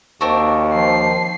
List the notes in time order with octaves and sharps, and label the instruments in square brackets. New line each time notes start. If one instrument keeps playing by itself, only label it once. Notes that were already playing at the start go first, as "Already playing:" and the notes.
[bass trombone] D#2 [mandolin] C4 D4 F#4
[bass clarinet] F3 [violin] C7